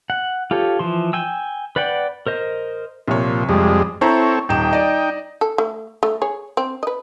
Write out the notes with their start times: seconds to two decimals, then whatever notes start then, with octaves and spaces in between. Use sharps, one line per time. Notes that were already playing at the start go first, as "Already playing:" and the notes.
0.10 F#5
0.51 F4 G4 A4 C#5
0.79 E3 F3 C6
1.13 G5 G#5 E6
1.76 B4 D5 F#5 G5
2.27 A#4 C5 D#5
3.08 C2 A#2 F3 C#5
3.49 F2 G3 G#3
4.01 C4 E4 A4 C5 C#5 A#5
4.49 D#1 D#4 G5 E7
4.73 D5 D#5
5.41 A4
5.58 A3
6.03 A3
6.22 G#4 C#5
6.57 C4
6.83 B4 D#5